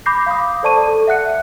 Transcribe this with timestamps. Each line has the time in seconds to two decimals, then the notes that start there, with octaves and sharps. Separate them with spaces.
0.06 B5 D6 G6 A#6 C7
0.26 F5 B5 D6 D#6
0.63 A4 C5 D5 A5 C#6 D#7
0.88 A4
1.07 E5 F#5 F#6 C#7